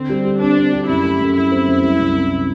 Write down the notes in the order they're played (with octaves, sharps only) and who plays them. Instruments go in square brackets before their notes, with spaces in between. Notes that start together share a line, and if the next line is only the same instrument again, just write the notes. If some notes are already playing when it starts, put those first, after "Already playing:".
Already playing: [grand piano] D3 [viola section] C4
[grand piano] G3
G4
[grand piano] C4 [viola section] D4
[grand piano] C4
G4
[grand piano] F#2 [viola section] E4
[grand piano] A3
F#2
[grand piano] A3 [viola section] E4
[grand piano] C4
F#2
G3
C2
C3